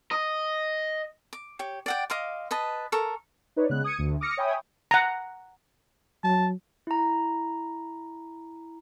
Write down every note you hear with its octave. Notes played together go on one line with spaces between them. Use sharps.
D#5
D6
G4 C#5
D5 F#5 G5
D#5 F5 C6 D6
B4 D#5 A5
A4 A#4 C#6
D#4 B4 C#5 D5
C#3 G#3 B3 F#6
D#6 G#6 C#7 D#7
D2
D6 D#6 F6 A#6 C#7
C#5 E5 G5 G#5 B5 D#6
F#5 A#5
F#3 A5
E4 A#5